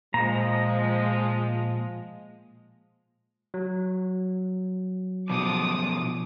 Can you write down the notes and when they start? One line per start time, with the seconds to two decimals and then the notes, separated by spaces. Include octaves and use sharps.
0.14 A#2 F3 G#3 A#5
3.54 F#3
5.30 B2 F3 D6 D#6